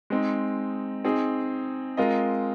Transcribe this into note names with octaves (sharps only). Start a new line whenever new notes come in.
G#3 C4 D#4
C4 D#4 G#4
G#3 C4 F4 A#4 D#5